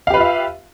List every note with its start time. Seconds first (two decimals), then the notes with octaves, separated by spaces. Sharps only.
0.07 F5
0.10 G4
0.14 B4
0.17 F4
0.20 E5